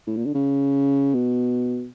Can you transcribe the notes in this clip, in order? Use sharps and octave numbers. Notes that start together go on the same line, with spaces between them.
A2
A#2
D3
C#3
B2